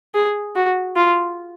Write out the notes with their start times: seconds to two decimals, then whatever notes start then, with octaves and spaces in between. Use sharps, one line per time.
0.15 G#4
0.55 F#4
0.96 F4